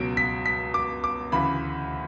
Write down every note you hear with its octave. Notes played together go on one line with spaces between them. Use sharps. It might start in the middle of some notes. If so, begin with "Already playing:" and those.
Already playing: C#2 B2 F#3 D7
B6
B6
D6
D6
D2 C#3 E3 B5